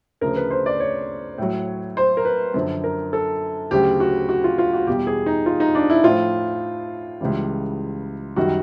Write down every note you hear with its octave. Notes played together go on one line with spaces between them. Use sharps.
D2 C#3 F3 A#4
B4
C5
D5
C#5
A2 F#3
C5
A#4
B4
F#2 D3 F3
A#4
A4
D2 C#3 F#3 G4
F#4
F#4
F4
F4
F#4
E2 B2 G3 G4
G#4
D#4
F4
D#4
D4
E4
A2 F3 F4
C#2 C#3 E3 G3
F#2 D#3 G3 F#4